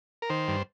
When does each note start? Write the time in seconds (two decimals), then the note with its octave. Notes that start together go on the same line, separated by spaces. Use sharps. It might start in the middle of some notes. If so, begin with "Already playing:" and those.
0.22 A#4
0.30 D#3 C5
0.48 G2